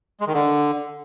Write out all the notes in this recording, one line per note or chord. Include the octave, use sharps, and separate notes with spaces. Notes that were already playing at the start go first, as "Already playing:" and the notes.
G#3
D#3
D3